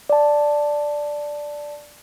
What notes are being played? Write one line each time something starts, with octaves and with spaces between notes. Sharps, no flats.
D5 A5